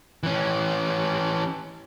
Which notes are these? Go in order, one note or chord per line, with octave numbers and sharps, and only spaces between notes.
E3 C#4